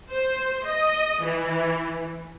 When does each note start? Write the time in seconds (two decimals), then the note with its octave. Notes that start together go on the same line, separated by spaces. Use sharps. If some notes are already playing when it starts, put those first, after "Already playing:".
0.12 C5
0.66 D#5
1.23 E3